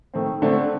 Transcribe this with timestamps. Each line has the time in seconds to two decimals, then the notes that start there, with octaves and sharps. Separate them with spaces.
0.14 D#3 A3 C4
0.42 D3 A3 C4